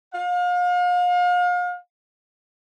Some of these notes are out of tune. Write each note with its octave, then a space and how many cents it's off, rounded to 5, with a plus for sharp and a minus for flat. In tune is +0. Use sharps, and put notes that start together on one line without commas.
F5 +35